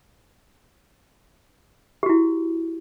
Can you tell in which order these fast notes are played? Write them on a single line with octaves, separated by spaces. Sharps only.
G4 F#4 E4